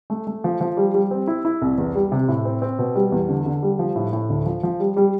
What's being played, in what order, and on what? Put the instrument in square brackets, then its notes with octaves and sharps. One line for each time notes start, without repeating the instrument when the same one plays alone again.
[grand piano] A3
A3
F3
F3
G3
G3
C4
E4
E4
C2
E2
G3
C3
A2
C4
C4
B2
G3
E2
D3
D3
G3
F3
A2
A2
D2
F3
F3
G3
G3